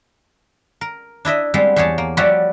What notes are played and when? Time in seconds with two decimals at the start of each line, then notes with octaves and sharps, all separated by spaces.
0.81 A#4
1.25 D4 E4 D#5 E5
1.54 G3 G#3 B3 C4
1.76 E2 G4 G#4 C#5 A5
1.98 A#3
2.17 F3 G3 F#4 C#5 D5 E5